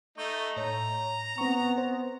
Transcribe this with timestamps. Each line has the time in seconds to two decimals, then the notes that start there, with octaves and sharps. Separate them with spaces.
0.18 A3 D#4 C#6 G6
0.57 A2 C#5 A#5
1.38 B3 C4 C#6
1.78 C5